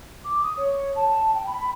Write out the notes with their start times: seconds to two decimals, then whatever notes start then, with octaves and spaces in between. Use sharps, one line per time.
0.24 D6
0.42 D#6
0.57 C#5
0.96 A5
1.34 G5
1.47 B5